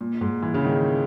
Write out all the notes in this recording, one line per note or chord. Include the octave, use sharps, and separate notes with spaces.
A#2
G#2
E3
C#3
D#3